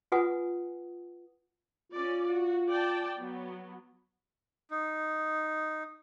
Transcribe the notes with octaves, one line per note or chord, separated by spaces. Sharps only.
F4 B4 F#5 G#5 D#6
C#4 F4 D5
F#4
D5 G5 A5
F#3 B3
D#4